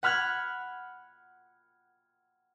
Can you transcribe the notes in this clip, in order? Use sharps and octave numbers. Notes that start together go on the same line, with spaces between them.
F#5 B5 F6 F#6 G#6